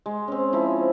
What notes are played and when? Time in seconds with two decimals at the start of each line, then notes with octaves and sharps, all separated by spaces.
0.06 G#3
0.28 C4 C#4
0.53 F3 E4